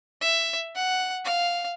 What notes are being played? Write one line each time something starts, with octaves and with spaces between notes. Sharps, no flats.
E5
F#5
F5